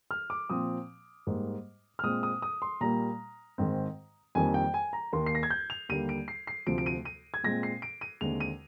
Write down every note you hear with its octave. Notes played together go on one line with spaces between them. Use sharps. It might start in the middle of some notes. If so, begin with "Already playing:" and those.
F6
D6
A#2 F3 C4 D#6
G#2 G3 A#3
F6
A#2 G#3 C4 D#6
D#6
D#6
C6
A#2 G3 A#3 A#5
G#2 D#3 G#3 C4
F2 D#3 G3 A#3 G#5
G5
G#5
A#5
D#2 D#3 A#3 C6
C7
A#6
G#6
G6
F7
D#2 D3 G3 A#3 D#7
D7
C7
C7
D2 C3 F3 D7
D7
D#7
D#7
G#6
A#2 G#3 C4 A#6
C7
D7
D#7
D#2 D3 G#3 C4 F7
D#7